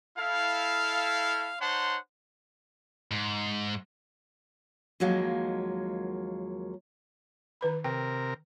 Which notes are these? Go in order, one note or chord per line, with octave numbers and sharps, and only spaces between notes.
E4 A4 F5
D#4 C5 C#5 F#5 A5 C6
G#2
D#2 F3 F#3 G#3 A#3
D#3 B4 B5
C3 A#4 G5